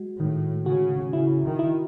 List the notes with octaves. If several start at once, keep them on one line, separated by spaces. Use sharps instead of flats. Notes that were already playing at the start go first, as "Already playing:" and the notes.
Already playing: G#3 F#4
A2 D#3
C#3 F#4
C#3 E4
D#3
E4